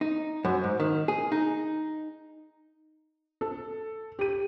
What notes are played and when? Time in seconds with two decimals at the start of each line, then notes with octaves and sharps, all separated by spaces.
0.01 D#4
0.45 F#2
0.64 G#2
0.80 D#3
1.08 G#4
1.32 D#4
3.41 A4
4.19 G4 D#7